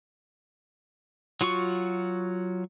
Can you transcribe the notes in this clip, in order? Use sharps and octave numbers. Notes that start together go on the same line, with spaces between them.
F#3 F4 F#4 C#6